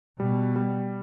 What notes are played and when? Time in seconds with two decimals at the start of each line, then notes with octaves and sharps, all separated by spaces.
0.19 B2 G3
0.56 G3